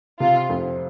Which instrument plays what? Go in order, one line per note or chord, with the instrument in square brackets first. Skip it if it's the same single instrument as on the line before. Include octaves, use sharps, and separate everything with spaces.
[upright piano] C3 [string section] F4
[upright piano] F2